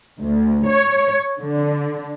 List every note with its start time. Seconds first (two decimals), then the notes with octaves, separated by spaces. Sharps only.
0.21 D2
0.68 C#5
1.40 D3